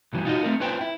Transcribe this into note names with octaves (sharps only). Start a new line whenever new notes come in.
B1 G2 E3 G3
D#4 F4 F#4 D#5
A3 C4 A#4
C#4 F4 B4 C5 G5
E4